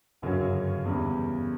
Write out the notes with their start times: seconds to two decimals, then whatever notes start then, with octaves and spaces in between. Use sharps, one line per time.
0.22 G1 F#2 C#3 F#3 C#4
0.85 E2 C#3 G3